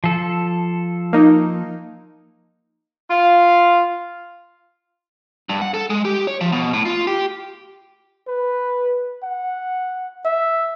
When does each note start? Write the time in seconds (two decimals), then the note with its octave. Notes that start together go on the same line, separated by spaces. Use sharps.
0.04 F3 A4
1.13 A#3 D#4
3.11 F4 F5
5.49 G2
5.62 F#5
5.74 A4
5.90 G#3
6.05 G4
6.27 C#5
6.41 F3
6.52 B2
6.74 A2
6.85 F4
7.07 G4
8.28 B4
9.23 F#5
10.25 E5